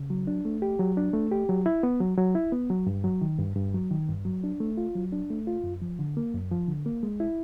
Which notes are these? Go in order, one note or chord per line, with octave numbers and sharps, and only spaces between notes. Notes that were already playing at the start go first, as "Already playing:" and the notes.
Already playing: C#3
F#3
D4
A3
G4
F#3
D4
A3
G4
F#3
E4
B3
F#3
F#3
E4
B3
F#3
G2
F#3
D#3
G2
G2
F#3
D#3
G2
F#3
D4
A3
F4
F#3
D4
A3
F4
F#2
F3
D3
A#3
F#2
F3
D3
A#3
G#3
E4